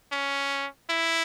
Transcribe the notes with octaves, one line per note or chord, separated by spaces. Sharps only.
C#4
E4